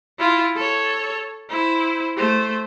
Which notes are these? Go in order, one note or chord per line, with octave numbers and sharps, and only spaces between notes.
E4 F4
A4 C#5
E4 C5
A3 C5